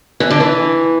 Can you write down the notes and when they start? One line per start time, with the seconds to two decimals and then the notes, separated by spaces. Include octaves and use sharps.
0.20 E3
0.30 D3
0.40 E3